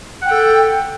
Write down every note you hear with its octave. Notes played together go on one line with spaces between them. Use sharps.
A4 F#5 G5